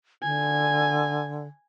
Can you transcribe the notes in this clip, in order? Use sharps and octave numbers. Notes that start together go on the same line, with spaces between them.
D3 G#5